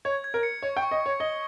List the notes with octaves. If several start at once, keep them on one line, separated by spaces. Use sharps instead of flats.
C#5 G#6
G#6
A#4
C#7
C#5 C#6
G5
C#6
D#5
C#6
C#5
D#5 G7